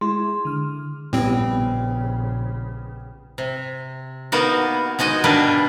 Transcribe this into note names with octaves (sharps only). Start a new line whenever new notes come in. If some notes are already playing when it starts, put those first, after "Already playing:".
G#3 E4 G#4 C6
D3 F6
A#1 A2 C#3 G3 B3 C4
C3
A#3 B3 D#4 F#4
G#3 D#4 F#4 D#5
B2 G3 A#3 D4 B4